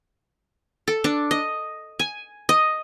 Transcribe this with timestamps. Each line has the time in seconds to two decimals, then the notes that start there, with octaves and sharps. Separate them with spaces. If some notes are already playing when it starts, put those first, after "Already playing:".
0.88 A4
1.04 D4
1.31 D#5
1.99 G#5
2.49 D#5